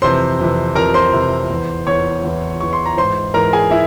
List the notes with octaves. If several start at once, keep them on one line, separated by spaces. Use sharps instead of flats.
F2 C3 E3 C5 C6
F2 C3 E3
F2 C3 E3 A#4 A#5
C5 C6
F2 C3 E3
E2 E3
E2 E3 C#5 C#6
E2 E3
E2 E3 C#6
C6
A#5
G#2 E3 C5 C6
G#2 E3 A#4 A#5
G#4 G#5
E4 E5